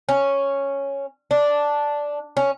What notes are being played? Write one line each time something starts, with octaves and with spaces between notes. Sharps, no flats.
C#4
D4
C#4